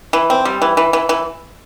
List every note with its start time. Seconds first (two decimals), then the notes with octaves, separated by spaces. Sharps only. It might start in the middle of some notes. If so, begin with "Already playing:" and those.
0.13 E3
0.30 C4
0.45 G3
0.62 E3
0.77 E3
0.93 E3
1.09 E3